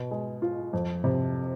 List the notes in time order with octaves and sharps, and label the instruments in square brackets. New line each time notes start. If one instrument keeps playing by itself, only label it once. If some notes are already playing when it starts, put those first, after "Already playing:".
Already playing: [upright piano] B2
G#3
F4
F2
C3